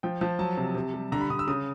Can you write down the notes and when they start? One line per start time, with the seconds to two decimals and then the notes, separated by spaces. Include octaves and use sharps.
0.03 F3 G5
0.21 F3 A5
0.39 F#3 A5
0.57 C3
0.75 C3
0.94 G3
1.12 D3 A#5
1.21 B5
1.30 D3 D#6
1.39 E6
1.47 C#3 D#6